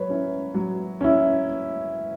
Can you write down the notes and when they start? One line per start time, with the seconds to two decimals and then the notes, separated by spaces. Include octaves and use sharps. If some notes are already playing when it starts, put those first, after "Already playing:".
Already playing: F#3 B4 C#5
0.10 C#4 E4
0.54 F#3
1.01 C#4 E4